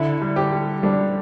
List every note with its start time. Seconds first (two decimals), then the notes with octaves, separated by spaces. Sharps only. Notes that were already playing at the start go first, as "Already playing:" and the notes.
Already playing: D3 E4
0.22 G3
0.36 G4
0.52 G3
0.83 G3 D4